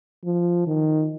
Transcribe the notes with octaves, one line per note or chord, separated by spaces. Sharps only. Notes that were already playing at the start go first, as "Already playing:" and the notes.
F3
D#3